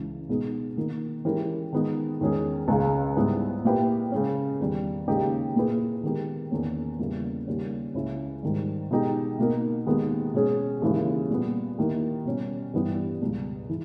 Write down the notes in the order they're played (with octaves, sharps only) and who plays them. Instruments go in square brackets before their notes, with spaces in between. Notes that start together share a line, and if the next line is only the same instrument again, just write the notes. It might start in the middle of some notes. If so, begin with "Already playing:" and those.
Already playing: [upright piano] C#2 C#3 E3
B2 G#3 B3 D#4 G#4
D#3 A#3 D#4
E3 G#3 C#4 G4 A#4
D#3 G#3 B3 D#4
E2 D#3 G#3 C#4 G#4
C#2 C#3 G#3
G#2 G3 B3 E4
A#2 A#3 E4 G4 B4
C#3 G#3 C#4
E2 D#3 G3
D#2 C#3 G#3 D#4 G4
A#2 A#3 E4 G#4 B4
D#3 G#3 B3 G4 A#4
E2 D#3 A#3 C#4
E2 C#3 G3 A#3 E4
D#2 C#3 G3 C#4
C#2 C#3 G#3 C#4 E4
G#2 D#3 G3
B2 G#3 D#4 G4
B2 A#3 D#4 A#4
D#2 D#3 G#3 B3
B2 G#3 C#4 G#4
D#2 C#3 E3 G#3 C#4
A#2 G3 B3
D#2 D#3 A#3 E4
B2 G3 C#4
G2 E3 G3 B3 G4
C#2 B2 G3
E3